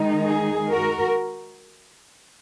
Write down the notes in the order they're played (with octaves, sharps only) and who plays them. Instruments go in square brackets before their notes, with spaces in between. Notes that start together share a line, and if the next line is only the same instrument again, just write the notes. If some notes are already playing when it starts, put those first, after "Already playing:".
Already playing: [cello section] D#3 G#3 D#4
G#4
F#4 A#4